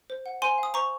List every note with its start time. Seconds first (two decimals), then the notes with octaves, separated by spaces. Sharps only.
0.10 C5
0.26 F#5
0.42 C5 G#5 C6
0.58 F5 D#6
0.74 C5 A#5 C#6